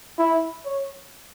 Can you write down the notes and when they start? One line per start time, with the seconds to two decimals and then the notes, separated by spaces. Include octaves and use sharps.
0.19 E4
0.65 C#5